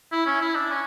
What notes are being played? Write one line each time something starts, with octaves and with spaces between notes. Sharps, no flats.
E4
C#4
E4
D4
C#4